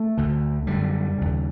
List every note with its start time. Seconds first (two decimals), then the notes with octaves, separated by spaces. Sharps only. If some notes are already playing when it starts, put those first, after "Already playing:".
Already playing: A3
0.17 D2 D3
0.67 F#2 D3 G3
1.18 D#2 C#3